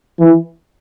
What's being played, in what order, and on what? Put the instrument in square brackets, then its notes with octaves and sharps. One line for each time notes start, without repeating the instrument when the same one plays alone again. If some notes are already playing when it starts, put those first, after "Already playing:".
[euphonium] E3